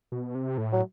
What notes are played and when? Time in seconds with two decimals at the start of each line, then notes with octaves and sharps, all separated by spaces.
0.12 B2
0.35 C3
0.58 A2
0.73 F#3